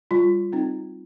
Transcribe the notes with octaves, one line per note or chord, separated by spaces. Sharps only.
G3 F4
C4 D#4